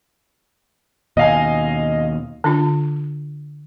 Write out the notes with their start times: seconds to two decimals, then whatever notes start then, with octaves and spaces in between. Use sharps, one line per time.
1.17 D#2 B2 D#5 F5 G#5
2.44 D3 D4 F4